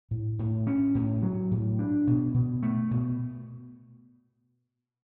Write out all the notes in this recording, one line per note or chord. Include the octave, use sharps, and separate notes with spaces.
A2
A2
C#4
A2
F#3
A2
D4
B2
B2
A3
B2